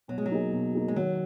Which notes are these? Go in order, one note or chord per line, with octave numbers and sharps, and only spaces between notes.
B2 F#3
G#3
F#3
A#3 D#4 G#4
B2
A#3 D#4 G#4
G#3
D#3 F#3